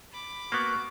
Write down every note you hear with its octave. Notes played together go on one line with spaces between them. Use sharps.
B5 D6
A#3 B3 F#4